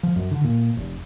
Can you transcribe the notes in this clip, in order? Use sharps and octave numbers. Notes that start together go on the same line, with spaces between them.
F3
F#2
D3
A#2
F1